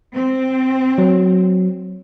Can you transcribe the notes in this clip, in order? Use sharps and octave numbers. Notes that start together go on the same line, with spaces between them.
C4
F#3